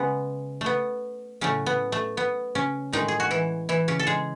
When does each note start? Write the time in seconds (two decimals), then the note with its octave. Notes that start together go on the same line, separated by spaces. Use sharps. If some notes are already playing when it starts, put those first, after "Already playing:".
Already playing: C#3 G#3 B3 C#4
0.61 A3
0.66 B3
1.41 A2 C#3 F#3 A3 C#4
1.66 B3
1.92 A3
2.17 B3
2.55 C#3 C#4
2.93 A2 D#3 G#3 D#4
3.08 G#4
3.20 F#4
3.31 E3 E4
3.69 E3 E4
3.88 C#3 C#4
3.99 A4
4.07 G#3 G#4